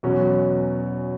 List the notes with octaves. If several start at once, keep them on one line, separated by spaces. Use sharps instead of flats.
E2 B2 F#3 C#4